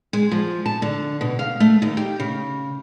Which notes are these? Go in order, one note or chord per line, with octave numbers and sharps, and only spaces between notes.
G#3
F3
A5
D3
B2
F5
A3
D#2
G4
C#3